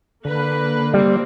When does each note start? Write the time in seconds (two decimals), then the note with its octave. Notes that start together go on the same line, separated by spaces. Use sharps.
0.25 D3 A#3 B4
0.94 G3 A#3 C4